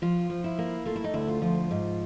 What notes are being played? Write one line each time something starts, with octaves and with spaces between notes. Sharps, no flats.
F3 F4
F3
E4
A#3
A3 F4
E4
D#4
D2 E4
F4
F3
G#2